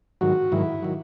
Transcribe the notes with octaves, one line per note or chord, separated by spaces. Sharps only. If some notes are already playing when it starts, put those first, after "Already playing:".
G#2 D#3 F#3 F#4
G#2 D#3 F#3 E4
D#3 F#3